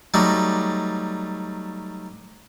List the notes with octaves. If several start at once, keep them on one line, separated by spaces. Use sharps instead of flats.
F#3 G3 A3 D#4